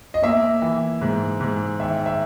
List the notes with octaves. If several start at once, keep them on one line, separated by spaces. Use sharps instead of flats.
D#5
A#3 E5
E3
G#2
G#2
D#3 E5
E5